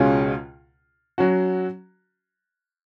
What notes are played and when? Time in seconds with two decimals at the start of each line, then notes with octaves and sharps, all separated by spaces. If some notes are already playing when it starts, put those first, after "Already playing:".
Already playing: C#2 B2 G#3 C#4 F4
1.18 F#3 C#4 F#4